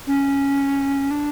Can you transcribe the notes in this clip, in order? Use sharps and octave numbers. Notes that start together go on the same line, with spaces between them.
C#4
D4